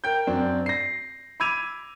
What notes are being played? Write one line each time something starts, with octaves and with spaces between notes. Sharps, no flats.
A#4 G5 G6
F#2 C4 D4
A#6 C7
B5 D6 E6 G#6 D#7 F7